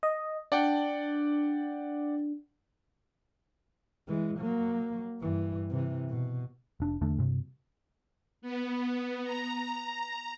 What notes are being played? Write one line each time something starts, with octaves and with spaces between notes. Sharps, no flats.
D#5
D4 D5 F#5 G5
E3 G#3
F#3 A#3
G2 E3
C3 E3
B2
F1 D4
E2 D3 A3 D4
G2 C3
B3
A#5